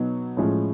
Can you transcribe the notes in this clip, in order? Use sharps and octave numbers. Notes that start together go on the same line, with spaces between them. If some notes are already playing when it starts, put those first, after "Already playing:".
Already playing: B2 F#3 B3 D#4
A2 F3 G#3 C#4